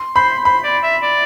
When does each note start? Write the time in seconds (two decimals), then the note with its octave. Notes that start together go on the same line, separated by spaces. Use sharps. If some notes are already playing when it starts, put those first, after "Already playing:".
Already playing: C6
0.16 C5 B5
0.44 C5 B5
0.64 D5
0.83 E5
1.03 D5